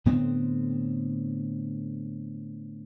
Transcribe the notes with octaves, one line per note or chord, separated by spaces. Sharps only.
A2 D3 B3 C4